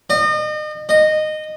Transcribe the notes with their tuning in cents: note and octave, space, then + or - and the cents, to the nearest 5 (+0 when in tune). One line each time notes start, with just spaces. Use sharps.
D#5 -35
D#5 -15